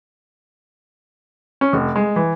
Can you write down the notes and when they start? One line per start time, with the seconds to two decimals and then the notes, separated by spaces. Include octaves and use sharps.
1.61 C#4
1.73 F1
1.96 G#3
2.16 E3